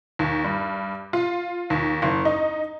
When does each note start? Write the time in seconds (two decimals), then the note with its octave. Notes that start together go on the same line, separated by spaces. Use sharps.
0.19 D#2
0.44 G2
1.13 F4
1.70 D#2
2.02 F#1
2.25 D#4